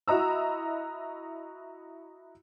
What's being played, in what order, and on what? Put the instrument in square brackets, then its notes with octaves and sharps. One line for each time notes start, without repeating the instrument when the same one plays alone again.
[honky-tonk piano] E4 F#4 D#5 A#5 E6